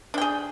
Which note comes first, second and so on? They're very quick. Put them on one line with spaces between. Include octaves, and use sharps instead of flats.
D4 G5 G#4